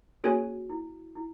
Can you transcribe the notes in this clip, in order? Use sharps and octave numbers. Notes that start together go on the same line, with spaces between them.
A#3 C#4 F#4 G#4 C#5 G#5
E4
E4